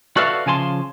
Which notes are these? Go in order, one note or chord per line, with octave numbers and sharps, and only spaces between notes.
F#4 A4 B4 D5 E5 F5
C#3 F3 G#5 A5 C6